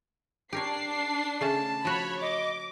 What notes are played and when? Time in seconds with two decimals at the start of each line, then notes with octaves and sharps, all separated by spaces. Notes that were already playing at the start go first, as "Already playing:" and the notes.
0.53 D4 G4 A#4 C#5 C7
1.41 C#3 A3 C#4 A5
1.85 F3 F#4 C#5 B5
2.21 D#5 D6